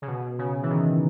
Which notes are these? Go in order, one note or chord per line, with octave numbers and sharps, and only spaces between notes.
C#3
B2
C#3
E3
D#3